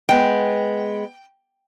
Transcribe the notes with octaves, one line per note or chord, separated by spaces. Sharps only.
G#3 B3 G5